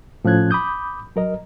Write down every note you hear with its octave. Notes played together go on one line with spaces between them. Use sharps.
A2 F3 C#4 F#6 G#6
B5 D6 D#6 G6
F#3 A#4 D#5